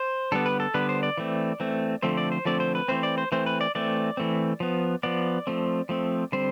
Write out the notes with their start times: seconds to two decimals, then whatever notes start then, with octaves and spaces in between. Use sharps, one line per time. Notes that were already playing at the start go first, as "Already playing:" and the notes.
Already playing: C5
0.32 D3 G3 B3 A4
0.46 B4
0.60 A4
0.74 D3 G3 B3 B4
0.89 C5
1.03 D5
1.17 E3 A3 C4
1.60 E3 A3 C4
2.02 D3 F3 A3 C4 C5
2.17 D5
2.32 C5
2.45 D3 F3 A3 C4 D5
2.60 C5
2.75 B4
2.88 E3 A3 C4 C5
3.03 D5
3.18 C5
3.32 E3 A3 C4 C5
3.46 B4
3.61 D5
3.75 E3 A3 C4 D5
4.17 E3 A3 C4
4.60 F3 B3
5.03 F3 B3 D5
5.47 F3 A3 C4
5.89 F3 A3 C4
6.32 D3 G3 C4 C5